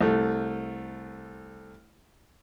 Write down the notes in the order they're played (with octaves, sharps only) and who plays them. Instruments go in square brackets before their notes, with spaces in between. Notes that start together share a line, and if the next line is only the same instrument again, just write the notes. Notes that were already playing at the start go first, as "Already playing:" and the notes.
[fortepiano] C2 A3